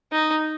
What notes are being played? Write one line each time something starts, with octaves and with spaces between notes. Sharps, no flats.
D#4